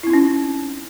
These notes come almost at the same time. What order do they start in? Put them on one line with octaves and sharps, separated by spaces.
E4 C4 D#4 C#4